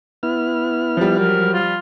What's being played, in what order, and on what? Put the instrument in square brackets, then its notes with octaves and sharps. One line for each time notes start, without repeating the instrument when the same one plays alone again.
[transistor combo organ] B3 E4 F6
[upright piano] F3 G3
[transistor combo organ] F#3 [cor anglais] A#4
[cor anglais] F4